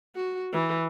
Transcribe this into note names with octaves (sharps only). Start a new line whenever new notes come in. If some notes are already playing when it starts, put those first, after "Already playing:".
F#4
E3